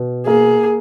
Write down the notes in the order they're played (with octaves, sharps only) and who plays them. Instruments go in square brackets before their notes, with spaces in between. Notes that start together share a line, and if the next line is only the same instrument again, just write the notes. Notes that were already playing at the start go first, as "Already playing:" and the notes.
Already playing: [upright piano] B2
[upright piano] A#3 [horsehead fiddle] G#4